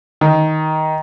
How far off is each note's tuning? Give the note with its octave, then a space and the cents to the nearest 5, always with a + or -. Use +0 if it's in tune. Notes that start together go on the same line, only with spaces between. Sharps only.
D#3 +10